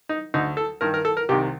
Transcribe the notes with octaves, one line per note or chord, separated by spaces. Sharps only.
D#4
D2 D3 D#4
A4
G2 D#3 A#4
A#4
A4
A#4
C2 C3 D#3 G4